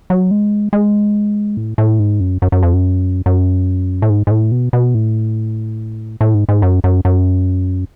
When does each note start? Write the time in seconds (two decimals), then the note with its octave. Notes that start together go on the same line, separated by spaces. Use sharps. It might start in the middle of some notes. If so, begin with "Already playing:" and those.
0.10 F#3
0.31 G#3
0.73 G#3
1.57 A2
1.78 A2
1.99 G#2
2.20 F#2
2.42 F#2
2.52 F#2
2.63 F2
2.73 F#2
3.26 F#2
4.02 A2
4.10 G#2
4.27 G#2
4.31 A2
4.52 B2
4.73 B2
4.94 A2
6.21 A2
6.34 G#2
6.49 G#2
6.62 F#2
6.84 F#2
7.05 F#2